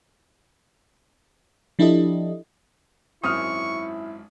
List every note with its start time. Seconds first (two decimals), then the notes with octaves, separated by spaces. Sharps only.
1.79 F3 D4 E4 G4 A4 D#5
3.24 G#1 F#2 C4 E4 C#6 D#6 F6